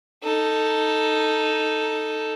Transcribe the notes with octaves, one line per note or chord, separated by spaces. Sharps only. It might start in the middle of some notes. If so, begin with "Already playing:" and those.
D#4 A4